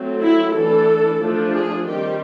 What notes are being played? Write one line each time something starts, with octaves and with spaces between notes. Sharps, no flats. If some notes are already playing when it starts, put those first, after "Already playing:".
Already playing: F#3 A3 C4
E4
E3 A3 D4 A4
F3 A3 D4
G#4
D#3 G3 C4 G4